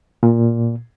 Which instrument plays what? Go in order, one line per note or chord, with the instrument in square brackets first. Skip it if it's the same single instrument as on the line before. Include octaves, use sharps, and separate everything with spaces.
[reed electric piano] A#2